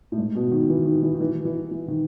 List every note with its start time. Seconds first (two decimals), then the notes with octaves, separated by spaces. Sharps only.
0.12 A2
0.18 G#2
0.35 B2
0.52 D#3
0.69 E3
0.85 D#3
1.03 E3
1.15 D#3
1.20 E3
1.45 E3
1.71 E3
1.88 D#3